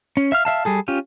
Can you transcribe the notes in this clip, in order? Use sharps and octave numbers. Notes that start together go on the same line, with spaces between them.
C#4
E5 F5 F6
E5 F5 A5
G3 G#4 A4
C#4 F4 G4